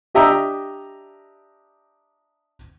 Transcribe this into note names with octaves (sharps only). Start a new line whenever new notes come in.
D4 G4 D#5 E5 G5 A#5